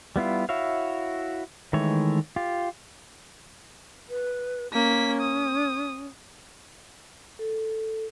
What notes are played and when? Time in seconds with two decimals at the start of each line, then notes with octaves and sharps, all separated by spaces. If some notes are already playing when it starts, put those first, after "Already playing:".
0.16 G3 B3 E4 F4
0.49 E4 F#4 C#5 E5 F5
1.73 D#3 E3 G#3 A3 C#5
2.36 F4 G4
4.09 B4
4.73 A#3 C#4 B6
5.21 D#6
7.39 A4